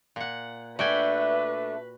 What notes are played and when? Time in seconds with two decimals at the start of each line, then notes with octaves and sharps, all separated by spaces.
0.16 A#2 F#5
0.79 A3 D4 F#4 B4 E5 G5 G#5